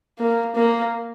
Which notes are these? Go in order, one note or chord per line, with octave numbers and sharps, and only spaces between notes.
A#3
A#3